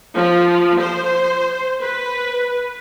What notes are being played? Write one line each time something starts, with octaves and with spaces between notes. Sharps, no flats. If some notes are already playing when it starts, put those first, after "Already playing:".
F3
C5
B4